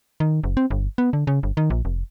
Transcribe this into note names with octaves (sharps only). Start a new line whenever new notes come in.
D#3
F#1
C4
G1
B3
D3
C#3
G1
D#3
A#1
F1